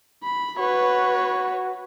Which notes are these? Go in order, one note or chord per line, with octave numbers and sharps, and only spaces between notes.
B5
F#4 B4 C#5